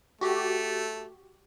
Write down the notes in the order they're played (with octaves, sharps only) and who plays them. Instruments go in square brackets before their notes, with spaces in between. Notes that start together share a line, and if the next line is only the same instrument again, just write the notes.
[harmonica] A3 [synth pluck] F#4 G4